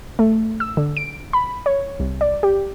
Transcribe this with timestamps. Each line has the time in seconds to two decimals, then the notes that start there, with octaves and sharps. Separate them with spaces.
0.19 A3
0.60 E6
0.77 D3
0.97 D7
1.33 B5
1.66 C#5
2.00 C2
2.21 D5
2.43 G4